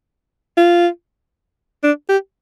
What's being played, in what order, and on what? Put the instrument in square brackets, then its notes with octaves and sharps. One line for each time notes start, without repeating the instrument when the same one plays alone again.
[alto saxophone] F4
D4
G4